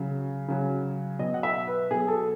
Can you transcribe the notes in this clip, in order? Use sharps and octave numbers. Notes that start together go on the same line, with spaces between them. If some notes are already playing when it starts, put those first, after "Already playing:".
Already playing: C#3 F#3
C#3 F#3
B2 F#3 D#5
F#5
E5
B4
B2 F#3 G#4
A4